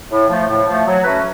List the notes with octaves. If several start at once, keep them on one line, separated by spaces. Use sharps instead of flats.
A2
F3 A3
A2
F3 A3
F#3
A3 C#4 F#4 B4